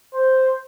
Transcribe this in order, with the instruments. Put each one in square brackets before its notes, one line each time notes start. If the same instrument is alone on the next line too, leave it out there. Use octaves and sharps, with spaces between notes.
[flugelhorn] C5